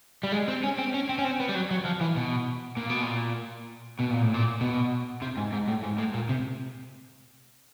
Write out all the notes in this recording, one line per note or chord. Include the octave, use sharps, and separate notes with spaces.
G3
G#3
C4
C#4
C4
C#4
C4
C#4
C4
B3
G3
F#3
F#3
F3
E3
B2
A#2
B2
A#2
B2
A#2
A2
A#2
B2
C3
G#2
G#2
A2
G#2
A2
A#2
C3